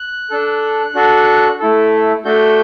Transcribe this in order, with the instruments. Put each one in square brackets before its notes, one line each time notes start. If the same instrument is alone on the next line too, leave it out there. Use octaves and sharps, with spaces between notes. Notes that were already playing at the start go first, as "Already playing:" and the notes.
Already playing: [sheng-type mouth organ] F#6
D4 A4
D4 F#4 A4
A3 E4 A4
A3 D4 F#4 A4 G6